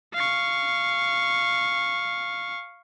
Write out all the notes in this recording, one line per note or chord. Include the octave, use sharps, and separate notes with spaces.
F5 C#6